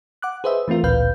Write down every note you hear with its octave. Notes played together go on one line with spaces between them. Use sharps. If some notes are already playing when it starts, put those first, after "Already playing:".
F#5 D6 F#6
G#4 B4 C5 D#5 E5
E3 A3 C4 F4 A#4
A1 D2 A#2 B4 F5 G6